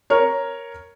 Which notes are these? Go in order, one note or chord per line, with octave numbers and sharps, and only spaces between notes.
A#4 C#5